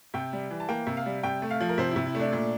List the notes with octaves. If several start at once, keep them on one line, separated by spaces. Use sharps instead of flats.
C3 G5
G3
E3
A5
A#3 G5
C3
F5
G3
C3 G5
A3
F5
F3
A#4
C3 C5
E4
C3
E4
A3 D4
A#2